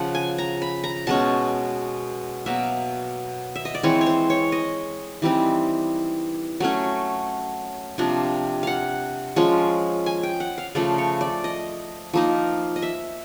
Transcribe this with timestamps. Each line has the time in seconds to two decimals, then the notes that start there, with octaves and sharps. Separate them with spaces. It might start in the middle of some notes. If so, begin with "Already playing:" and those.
Already playing: C#3 F3 F#5
0.15 G#5
0.38 A#5
0.62 B5
0.84 A#5
1.07 B2 G#3 C#4 A5
2.46 B2 F#3 A#3 E5
3.55 E5
3.65 D#5
3.75 D5
3.83 E3 G#3 C4 C#5
4.01 C#5
4.06 C5
4.30 C#5
4.52 D#5
5.22 E3 G3 C4 D#4
6.60 F#3 A3 C#4
7.98 C3 F3 A#3 D4
8.63 F5 F#5
9.36 F3 G#3 C#4
10.06 G#5
10.23 G5
10.40 F#5
10.58 F5
10.75 C#3 F3 A3 D5
10.98 C#5
11.21 D5
11.44 D#5
12.14 F3 A#3 D#4
12.76 D#5
12.82 E5